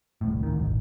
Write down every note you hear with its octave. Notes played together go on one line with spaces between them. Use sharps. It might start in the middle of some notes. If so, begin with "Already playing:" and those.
D1 C2 A2
D2 D#3
D#1 G#1